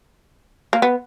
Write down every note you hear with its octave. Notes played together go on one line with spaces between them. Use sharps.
A#3
B3